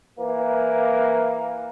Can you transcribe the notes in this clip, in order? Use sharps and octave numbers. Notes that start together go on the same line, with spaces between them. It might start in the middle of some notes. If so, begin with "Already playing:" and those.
E3 A#3